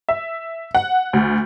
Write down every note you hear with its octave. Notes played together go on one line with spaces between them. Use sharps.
E5
F#5
D2